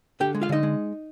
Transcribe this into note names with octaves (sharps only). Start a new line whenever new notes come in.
D3 G4 G5
G#3
F4 F5
D3 D#4 D#5
G#3